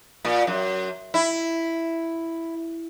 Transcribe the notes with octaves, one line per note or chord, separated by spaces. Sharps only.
A#2
F#2
E4